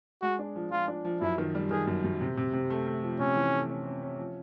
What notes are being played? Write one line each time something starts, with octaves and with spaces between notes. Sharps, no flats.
G#3 F#4
D4
F3
F3 F4
D4
F3
F#2 E4
D#3
G3
D#3 G#4
F#2
F#2
C3
C3
C3
A3
A3
F3
C3 C#4
E3
A3
C#4
C#4
C#4
F3